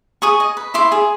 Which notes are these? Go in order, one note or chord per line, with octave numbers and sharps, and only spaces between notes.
G#4 C#6 D#6
D#5
B4
E4 C6 D6
G#4